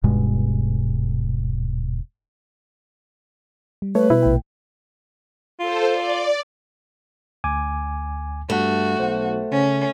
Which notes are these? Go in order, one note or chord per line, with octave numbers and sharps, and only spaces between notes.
D#1 G2 B2 G#3
G3
A3 B4 C#5
B2 E4
A#1 A3 G5
F4 A4 C5
D5
D2 G#5 D6
G2 A3 F#4
B1 C5 F#5
C#3 C#4